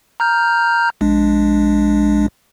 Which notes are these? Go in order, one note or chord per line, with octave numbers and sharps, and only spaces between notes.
A#5 F6 G6
A#1 G#3 D4